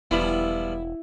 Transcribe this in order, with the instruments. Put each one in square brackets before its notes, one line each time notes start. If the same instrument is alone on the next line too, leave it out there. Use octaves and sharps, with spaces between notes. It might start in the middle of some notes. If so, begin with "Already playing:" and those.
[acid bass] E1 [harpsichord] F3 G3 B3 [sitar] E4